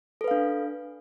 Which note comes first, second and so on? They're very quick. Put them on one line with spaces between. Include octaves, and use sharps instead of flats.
A4 B4 F5 D4